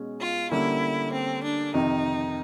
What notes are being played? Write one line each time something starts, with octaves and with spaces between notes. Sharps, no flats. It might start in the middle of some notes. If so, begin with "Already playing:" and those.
Already playing: B2 G#3 C#4
F4
D3 G3 A#3 C#4 E4
C4
D4
F2 C3 D#3 D#4